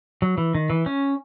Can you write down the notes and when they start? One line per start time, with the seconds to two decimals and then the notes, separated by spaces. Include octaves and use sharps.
0.22 F#3
0.38 E3
0.55 D#3
0.70 E3
0.86 C#4